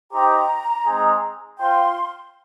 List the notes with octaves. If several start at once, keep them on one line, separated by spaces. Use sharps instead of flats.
D#4 G4 C5 G5 A#5
G#3 C4 D#4 G#4
F4 C5 G5 C6